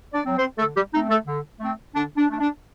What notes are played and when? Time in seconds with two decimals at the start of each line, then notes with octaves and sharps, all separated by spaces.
0.13 D4 D5
0.25 F#3 C4
0.37 C4 C5
0.58 D3 A3 A4
0.75 G3 G4
0.93 A3 C4 D#4
1.10 A3 A4
1.26 D3
1.60 A3 C4
1.93 D3 D4
2.17 D4
2.28 A3 D4
2.39 D4